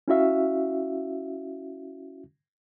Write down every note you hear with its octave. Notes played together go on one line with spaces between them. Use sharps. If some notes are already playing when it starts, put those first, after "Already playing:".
C#4 E4 F#4 E5 F5